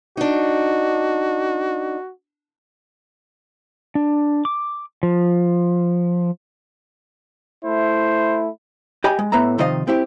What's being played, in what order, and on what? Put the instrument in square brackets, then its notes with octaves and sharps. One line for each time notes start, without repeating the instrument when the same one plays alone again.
[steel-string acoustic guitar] D4 D#4 [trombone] F#4
[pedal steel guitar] D4
D6
F3
[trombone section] A3 E4 [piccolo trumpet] C5
[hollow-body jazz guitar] G4 D#5 G#5 B5
G#3
A2 B3 E5 A#5
C3 D#3 F3 D#4 D#5 F5
C4 E4 G4